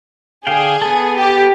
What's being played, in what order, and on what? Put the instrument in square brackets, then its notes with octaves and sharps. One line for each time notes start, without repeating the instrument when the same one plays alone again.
[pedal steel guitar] D3 F5 G5 [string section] G#4
[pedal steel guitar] B3 A4
[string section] G4